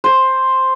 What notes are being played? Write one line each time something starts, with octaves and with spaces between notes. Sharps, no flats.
C5